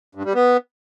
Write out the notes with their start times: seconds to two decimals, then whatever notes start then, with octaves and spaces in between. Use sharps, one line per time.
0.15 G2
0.25 G3
0.35 B3